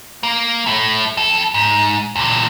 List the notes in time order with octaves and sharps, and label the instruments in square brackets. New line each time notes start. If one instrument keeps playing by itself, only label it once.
[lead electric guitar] A#3
A2 A3
F2 A4
G#2
E2 A#2